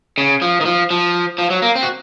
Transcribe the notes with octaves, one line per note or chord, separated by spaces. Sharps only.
C#3
F3
D#3
F3
F3
F3
F#3
A#3
C4
F#4